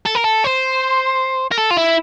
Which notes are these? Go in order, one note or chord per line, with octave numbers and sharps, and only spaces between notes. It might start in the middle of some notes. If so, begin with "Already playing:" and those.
A4
A#4
A4
C5
A#4
A4
F4
E4